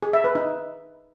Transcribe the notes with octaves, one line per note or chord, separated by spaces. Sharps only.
G#4
E5
B4
D#4